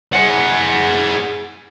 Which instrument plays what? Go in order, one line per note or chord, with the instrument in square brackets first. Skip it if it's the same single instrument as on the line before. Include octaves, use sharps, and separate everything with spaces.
[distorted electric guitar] G#4 F#5